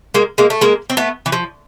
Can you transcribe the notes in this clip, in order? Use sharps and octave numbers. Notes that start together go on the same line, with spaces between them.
G#3 A#3
G#3 A#3
A3
G#3 A#3
C4
A3 B3
E3
F3